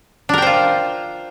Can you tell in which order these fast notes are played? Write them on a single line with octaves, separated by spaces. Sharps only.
D4 A#4 G5 C5 F4